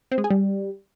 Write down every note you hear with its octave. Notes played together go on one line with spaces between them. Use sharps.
C4
G#3
G#4
G3